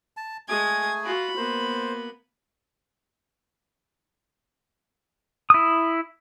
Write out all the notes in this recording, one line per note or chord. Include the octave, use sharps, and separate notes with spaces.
A5
G#3 A3 G#4 G#5 D#6 G#6
F4 F#4 B5
A#3 B3 C5
E4 D#6